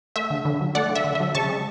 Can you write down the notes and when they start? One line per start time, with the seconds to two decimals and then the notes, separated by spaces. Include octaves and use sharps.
0.16 A3 E5
0.30 D3
0.45 D3
0.61 F#3
0.75 A3 D5 F#5
0.89 D3
0.95 E5
1.04 D3
1.15 E5
1.20 F#3
1.35 C#3 A5 C#6
1.49 G#3